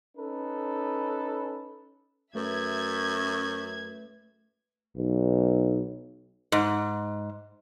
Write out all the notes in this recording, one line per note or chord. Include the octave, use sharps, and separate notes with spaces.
C#4 D#4 A4 B4
F#2 A3 B4 E5 G#6
B1
G#2